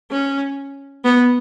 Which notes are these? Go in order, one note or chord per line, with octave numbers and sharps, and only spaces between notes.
C#4
B3